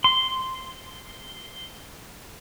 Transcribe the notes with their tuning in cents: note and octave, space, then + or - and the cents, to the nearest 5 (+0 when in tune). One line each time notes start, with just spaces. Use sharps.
C6 -5